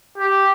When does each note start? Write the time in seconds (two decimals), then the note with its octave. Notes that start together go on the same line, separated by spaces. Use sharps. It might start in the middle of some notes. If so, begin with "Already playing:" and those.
0.18 G4